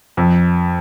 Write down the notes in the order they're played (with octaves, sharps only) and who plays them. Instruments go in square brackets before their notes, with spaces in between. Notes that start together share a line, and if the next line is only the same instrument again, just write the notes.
[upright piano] F2